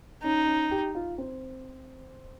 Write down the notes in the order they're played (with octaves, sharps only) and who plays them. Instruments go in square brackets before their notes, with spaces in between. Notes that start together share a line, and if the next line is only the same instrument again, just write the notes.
[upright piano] C#4 [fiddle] D#4
[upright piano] C#4
G4
F4
C4